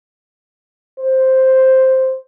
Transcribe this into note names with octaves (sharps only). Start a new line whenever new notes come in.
C5